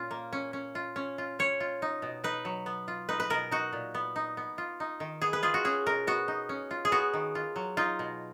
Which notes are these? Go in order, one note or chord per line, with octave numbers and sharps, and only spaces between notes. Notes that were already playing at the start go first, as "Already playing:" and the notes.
Already playing: A#2 C#4 F4
A#3
C#4
C#4
F4
C#4
F4
C#4 C#5
F4
D#4
B2
D#4 B4
F#3
B3
F4
D#4 B4
B4
B2 A#4
D#4 F#4
A#2
B3
D#4
B3
F4
D#4
D#3
B3 G#4
B4
F4 G#4
F#4
C#4 G#4
B2 A#4
B3 F#4
D#4
C#4
F4
G#4
B3 F#4
D#3
F4
F#3
D#4 F4
B2